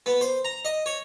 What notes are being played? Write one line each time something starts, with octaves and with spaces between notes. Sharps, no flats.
B3
C5
A#5
D#5
C#5